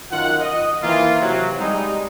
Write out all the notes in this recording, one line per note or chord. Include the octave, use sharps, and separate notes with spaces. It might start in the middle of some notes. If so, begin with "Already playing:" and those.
F#2 D#3 F4 F#5
D#5
D#3 E3 A#3 C4 F4
C3 F#3
G3 G#3 D#4